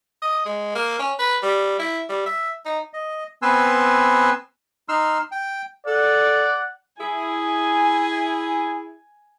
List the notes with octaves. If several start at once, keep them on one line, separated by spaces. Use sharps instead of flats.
D#5
G#3
A#3
C#4
B4
G3
E4
G3
E5
D#4
D#5
B3 C4 B4 G#5 C6 E6
D#4 C6 E6 F6
G5
A4 D5 F#5
E4 G#4 G#5